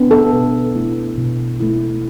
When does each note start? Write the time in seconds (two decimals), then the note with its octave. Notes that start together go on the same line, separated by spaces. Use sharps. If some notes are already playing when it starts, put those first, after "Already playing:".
Already playing: B3 D4
0.11 A4
0.33 B2
0.75 A3 E4
1.18 B2
1.60 A3 E4